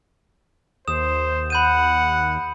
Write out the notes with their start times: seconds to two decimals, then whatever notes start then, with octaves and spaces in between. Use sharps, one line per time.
0.88 D#2 C5 D#6 E7
1.50 F#5 B5 G6 D#7